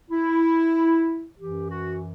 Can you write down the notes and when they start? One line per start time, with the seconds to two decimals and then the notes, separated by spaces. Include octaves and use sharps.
0.10 E4
1.38 F#2 E3 G4
1.71 F#4